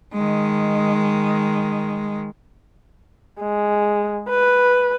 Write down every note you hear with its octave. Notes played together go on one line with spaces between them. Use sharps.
D#3 G#3
G#3
B4